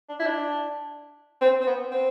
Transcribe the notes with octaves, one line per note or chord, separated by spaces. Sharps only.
D4
E4
D4
C4
C4
B3
C4